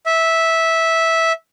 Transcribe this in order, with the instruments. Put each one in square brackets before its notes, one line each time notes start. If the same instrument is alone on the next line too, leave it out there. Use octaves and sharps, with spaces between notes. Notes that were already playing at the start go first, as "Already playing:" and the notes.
[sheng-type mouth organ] E5